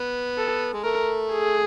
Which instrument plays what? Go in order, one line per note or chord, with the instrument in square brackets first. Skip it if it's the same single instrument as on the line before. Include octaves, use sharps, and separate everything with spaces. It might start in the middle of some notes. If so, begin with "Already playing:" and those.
Already playing: [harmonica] B3
[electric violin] A4
[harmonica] G#3
[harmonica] A3 [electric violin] A#4
[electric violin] G#4